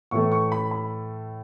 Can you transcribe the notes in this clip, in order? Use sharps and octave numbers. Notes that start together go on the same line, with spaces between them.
A2 E3 A3 C#6
C#6
B5
B5